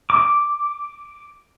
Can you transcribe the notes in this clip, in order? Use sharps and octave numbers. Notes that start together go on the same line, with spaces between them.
D6